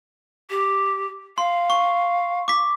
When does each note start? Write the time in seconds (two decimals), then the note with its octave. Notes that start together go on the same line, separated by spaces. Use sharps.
0.50 G4
1.38 F5 C6
1.70 C#6
2.48 D6 B6